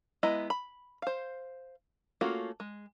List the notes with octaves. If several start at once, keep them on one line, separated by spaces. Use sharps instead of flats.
G#3 B3 E4 D#5 A#5
B5
C5 F5
A3 A#3 C#4 F4 F#4
G#3